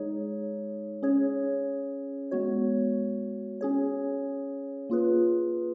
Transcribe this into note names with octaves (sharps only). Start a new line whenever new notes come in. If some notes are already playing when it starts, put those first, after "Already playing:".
Already playing: G#3 D#4 G#4 C#5
C#4 G#4 C#5
G#3 B3 F#4 C#5
C#4 G#4 C#5
A#3 F4 G#4 B4